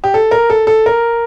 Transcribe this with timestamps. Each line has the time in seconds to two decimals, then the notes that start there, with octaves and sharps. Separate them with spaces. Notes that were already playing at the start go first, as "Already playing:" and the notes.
0.04 G4
0.14 A4
0.31 A#4
0.50 A4
0.67 A4
0.86 A#4